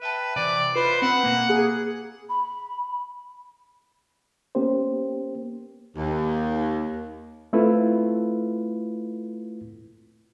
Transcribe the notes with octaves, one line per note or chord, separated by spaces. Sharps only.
B4 E5 G5 A5
C3 E3 D5
F4 B4 C5 D#5
C4 F#5 D#6 C#7
B2 A#3
G#4
B5
A#3 B3 C#4 G4 C5
D#2
A3 C4 E4 F4 A4 B4